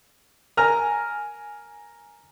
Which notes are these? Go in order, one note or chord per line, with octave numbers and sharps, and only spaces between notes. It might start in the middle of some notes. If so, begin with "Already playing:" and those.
A#4 G#5 A#5 F6